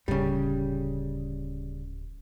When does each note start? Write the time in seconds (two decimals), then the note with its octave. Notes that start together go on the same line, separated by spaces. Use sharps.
0.08 D1 G1 C#3 G3